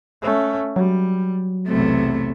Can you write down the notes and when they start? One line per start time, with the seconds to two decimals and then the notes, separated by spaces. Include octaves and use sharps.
0.22 A3 C#4
0.76 F#3 G3
1.68 B1 E2 C3 A3